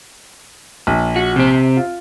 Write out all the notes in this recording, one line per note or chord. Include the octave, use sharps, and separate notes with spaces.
A#1
F#4
C3 C4
F4